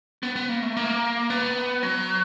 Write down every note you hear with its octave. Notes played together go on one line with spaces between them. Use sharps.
B3
B3
A#3
A3
A#3
B3
F#3